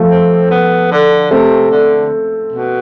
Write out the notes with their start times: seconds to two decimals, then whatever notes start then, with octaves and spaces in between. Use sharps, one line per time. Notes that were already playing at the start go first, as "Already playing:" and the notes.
Already playing: F3 A3
0.11 C4
0.51 B3
0.91 D3
1.31 C3 A3 C4
1.71 D3
2.52 B2